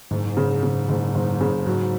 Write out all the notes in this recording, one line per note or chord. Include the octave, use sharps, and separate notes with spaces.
F#1 G#2
C#3
C#3
F#1
F#1
C#3
G#2 F#3